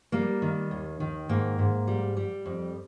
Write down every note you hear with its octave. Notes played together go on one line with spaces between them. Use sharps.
G3 A#3
D#3
D#2
D#3
G#2 A#3
G#2
G3
G3
F2